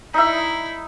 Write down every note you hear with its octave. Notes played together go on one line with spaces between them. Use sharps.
D#4 E4 E5